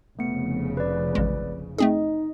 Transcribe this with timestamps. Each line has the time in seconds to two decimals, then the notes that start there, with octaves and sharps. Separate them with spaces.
0.19 F1 C#3 A3 B3 C#7
0.77 B4 D5
1.15 A1 G#3
1.78 A3 C4 D#4 G#4 D#5